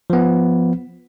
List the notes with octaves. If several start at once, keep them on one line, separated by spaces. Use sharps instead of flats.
F3 B3